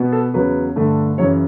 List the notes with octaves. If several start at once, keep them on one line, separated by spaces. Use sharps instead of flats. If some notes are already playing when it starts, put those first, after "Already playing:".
Already playing: B2 B3
A4
E2 C#3 F#3 B4
G2 D3 A3
F#2 C#3 E3 C#5